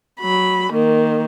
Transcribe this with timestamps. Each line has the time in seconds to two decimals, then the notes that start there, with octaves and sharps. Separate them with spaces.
0.20 F#3 B5
0.73 D#3 A#3